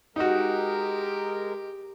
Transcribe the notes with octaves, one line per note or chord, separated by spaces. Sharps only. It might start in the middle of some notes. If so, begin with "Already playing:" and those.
G#3 D#4 F#4 G4 A#4